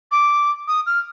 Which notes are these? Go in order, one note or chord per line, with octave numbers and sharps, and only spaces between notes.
D6
D#6
F6